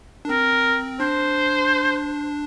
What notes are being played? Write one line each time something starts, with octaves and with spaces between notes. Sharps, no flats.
D4
C4 A#4
D4 C5